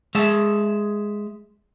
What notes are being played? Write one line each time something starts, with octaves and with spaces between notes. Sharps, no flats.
G#3 E5